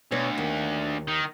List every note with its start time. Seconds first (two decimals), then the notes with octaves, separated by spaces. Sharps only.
0.12 D2 B2 C#5
0.38 D#2
1.08 D#3